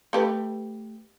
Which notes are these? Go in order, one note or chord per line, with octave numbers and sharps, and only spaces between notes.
A3 G4 B4